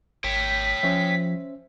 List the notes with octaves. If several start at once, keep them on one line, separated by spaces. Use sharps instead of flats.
G#1 C#5 G5 B6
F3 C#4 C5 E5